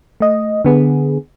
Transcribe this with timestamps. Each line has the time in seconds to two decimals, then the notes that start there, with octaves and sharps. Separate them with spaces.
0.20 A3 D#5
0.65 D3 B3 G#4